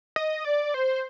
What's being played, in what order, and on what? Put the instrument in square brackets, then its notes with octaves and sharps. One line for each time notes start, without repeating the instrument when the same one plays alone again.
[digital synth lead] D#5
D5
C5